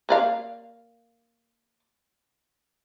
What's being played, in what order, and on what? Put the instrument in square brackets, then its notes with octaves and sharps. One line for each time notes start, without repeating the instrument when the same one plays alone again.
[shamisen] A#3 D5 F5